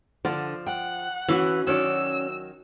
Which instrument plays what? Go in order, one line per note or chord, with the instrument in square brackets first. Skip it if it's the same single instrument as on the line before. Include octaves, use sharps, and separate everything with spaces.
[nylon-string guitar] D3 F#5 [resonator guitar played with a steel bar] F3 [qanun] D5
[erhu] F#5 [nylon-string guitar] G5
[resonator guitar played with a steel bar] E3 [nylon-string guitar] C#4 [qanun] F#4 D6
[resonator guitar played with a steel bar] D#3 F#3 [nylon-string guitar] C#4 C#5 D5 [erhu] E6